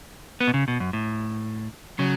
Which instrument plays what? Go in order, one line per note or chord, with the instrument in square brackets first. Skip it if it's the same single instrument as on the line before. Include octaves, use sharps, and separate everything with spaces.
[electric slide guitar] B3
B2
C#3
B2
F#2
A2
[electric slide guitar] C#3 [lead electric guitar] F#3